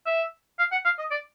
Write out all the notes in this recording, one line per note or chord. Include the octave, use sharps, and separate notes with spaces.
E5
F5
F#5
F5
D#5
D5